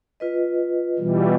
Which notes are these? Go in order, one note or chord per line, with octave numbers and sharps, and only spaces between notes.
F4 B4 D#5
B2 E3 G3